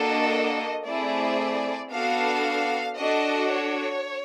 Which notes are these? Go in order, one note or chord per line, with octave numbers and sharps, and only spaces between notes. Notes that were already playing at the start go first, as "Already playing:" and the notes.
Already playing: A#3 D4 F#4 A4 D#5
A3 C4 E4 G#4 D5
B3 D4 F#4 A4 F5
D4 F#4 A4 D#5
C#5